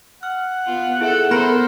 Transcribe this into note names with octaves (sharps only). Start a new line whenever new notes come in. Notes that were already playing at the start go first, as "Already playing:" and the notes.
F#5 F6
B3 F4
E4 G#4 A4 E5
B3 A4 A#4 C5 B5 A#6